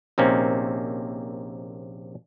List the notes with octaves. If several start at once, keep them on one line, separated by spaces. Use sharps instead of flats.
A#1 C3 A#3 C4 C#4 D#4